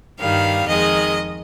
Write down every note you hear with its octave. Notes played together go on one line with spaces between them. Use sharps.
G2 D#3 G3 F5
F2 D#3 G#3 D#5